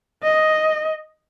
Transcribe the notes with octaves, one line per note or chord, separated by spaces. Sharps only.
D#5